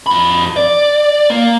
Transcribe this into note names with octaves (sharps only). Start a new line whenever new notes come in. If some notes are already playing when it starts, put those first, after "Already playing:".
F2 B5
D5
A#3